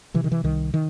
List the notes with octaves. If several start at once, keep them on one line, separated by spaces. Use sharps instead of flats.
C3 E3
D#3
E3
C2 D#3
D#3